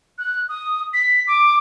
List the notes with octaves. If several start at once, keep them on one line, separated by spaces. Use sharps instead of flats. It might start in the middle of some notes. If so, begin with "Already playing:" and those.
F#6
D#6
B6
D6